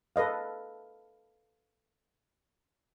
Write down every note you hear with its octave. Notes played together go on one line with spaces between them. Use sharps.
A4 B4 D#5 F5